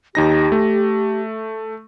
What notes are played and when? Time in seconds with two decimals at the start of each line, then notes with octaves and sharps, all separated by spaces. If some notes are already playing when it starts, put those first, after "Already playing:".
0.15 D#2 D#4 G4 A#6
0.52 A3